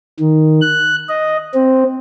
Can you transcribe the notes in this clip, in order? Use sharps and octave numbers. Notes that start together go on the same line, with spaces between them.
D#3
F#6
D#5
C4